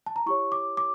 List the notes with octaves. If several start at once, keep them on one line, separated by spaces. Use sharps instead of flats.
A5
A#5
E4 G4 C#5 C#6
D6
D6